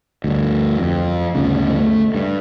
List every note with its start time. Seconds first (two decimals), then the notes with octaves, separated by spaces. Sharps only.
0.24 D2 G2
0.81 F2
1.35 G1 D2 C#3
1.81 A3
2.14 G2